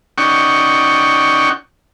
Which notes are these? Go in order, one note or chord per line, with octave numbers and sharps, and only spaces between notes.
C#4 D#4 D5 F#5 G5 C#6